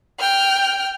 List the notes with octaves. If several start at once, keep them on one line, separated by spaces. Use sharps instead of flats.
G5 F6